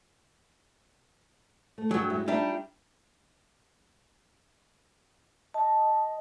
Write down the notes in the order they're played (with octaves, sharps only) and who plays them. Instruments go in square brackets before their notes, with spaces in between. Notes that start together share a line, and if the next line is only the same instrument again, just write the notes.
[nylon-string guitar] A3
[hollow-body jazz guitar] G2 F#3 [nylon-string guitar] G#4
[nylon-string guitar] G#3 E4 G4
[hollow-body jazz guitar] G3 D4 [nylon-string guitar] D#4 F4 E5
[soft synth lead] D#5 [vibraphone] A5